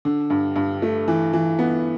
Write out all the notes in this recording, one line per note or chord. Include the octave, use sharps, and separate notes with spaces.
D3
G2
G2
A3
E3
E3
B3